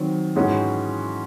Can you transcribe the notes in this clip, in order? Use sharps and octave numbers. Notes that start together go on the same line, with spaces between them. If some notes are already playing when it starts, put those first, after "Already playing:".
Already playing: D#3 F#3 C4
G#2 E3 G#3 C#4 F#4